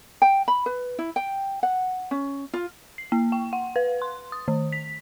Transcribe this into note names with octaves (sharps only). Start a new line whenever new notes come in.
G5
B5
B4
E4
G5
F#5
C#4
F4
C7
A#3
G5
F#5
B4
C6
D#6
D#3
B6